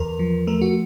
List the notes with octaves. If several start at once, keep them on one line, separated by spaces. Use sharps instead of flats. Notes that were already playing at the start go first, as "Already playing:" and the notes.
Already playing: E2 A#4
F3
A3 A#4
F#4